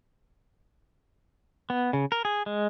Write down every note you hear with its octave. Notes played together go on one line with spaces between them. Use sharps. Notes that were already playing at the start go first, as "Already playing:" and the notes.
B3
C#3
A#4
G#4
G#3